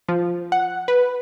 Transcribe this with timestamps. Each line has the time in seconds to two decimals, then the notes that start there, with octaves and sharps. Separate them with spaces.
0.09 F3
0.52 F#5
0.88 B4